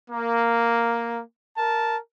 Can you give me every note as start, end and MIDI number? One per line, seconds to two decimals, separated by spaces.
0.10 1.21 58
1.57 1.98 70
1.57 1.98 81